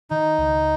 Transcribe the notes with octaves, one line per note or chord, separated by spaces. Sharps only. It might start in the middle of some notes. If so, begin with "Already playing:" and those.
D#3 D#4
C#2